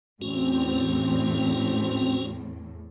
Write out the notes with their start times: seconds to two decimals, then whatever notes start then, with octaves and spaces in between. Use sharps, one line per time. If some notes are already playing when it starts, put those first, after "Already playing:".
0.22 E2 A2 C4 C#4 F#4